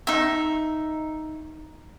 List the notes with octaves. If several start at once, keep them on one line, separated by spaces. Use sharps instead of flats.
D#4 E5